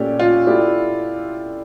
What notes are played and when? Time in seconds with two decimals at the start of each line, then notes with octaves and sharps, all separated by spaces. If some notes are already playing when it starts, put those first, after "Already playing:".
Already playing: A#2 A3 C#4 G4 D5
0.20 F4
0.46 A3 E4 G4 D5